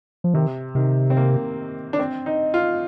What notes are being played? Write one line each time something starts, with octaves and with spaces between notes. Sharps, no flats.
F3
C3 D#3
C3 D#3
C4
A#3
D4
C4
D#4
F4